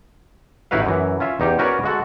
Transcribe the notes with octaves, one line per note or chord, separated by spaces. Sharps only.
A1 D#4 E4 F#4 B4 F5
F#2 E3
C#4 F4 E5
E2 D#4 G4
C#4 F#4 A#4 B4 C#5 D5
G#3 F#4 A4